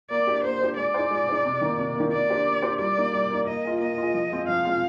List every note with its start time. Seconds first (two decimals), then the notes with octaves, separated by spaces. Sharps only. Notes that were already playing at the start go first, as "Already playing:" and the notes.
0.10 A#3 D5
0.27 D4 G4
0.44 A#3 C5
0.61 D4 G4
0.77 G#3 D5
0.94 D#4 G#4 C5
1.11 G#3
1.29 D#4 G#4 C5
1.45 C3
1.61 D#3 A#3
1.79 C3
1.95 D#3 A#3
2.12 A#3 D5
2.30 D4 G4 C5
2.47 A#3
2.62 D4 G4 C5
2.79 G3 D5
2.97 A#3 D#4
3.13 G3
3.30 A#3 D#4
3.47 A#3 D#5
3.65 F4 G#4
3.81 A#3 D#5
3.98 F4 G#4
4.14 F3
4.32 G#3 C4 F4
4.48 F3 F5
4.65 G#3 C4 F4